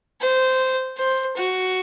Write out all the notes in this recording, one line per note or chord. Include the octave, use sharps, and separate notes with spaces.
C5
C5
F#4